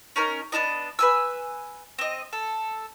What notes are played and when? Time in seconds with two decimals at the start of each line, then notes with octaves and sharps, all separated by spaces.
0.16 C#4 D#4 A#4
0.52 B3 D4 D#4 D#5
0.99 B4 G#5 E6
1.98 C4 D#5
2.33 A4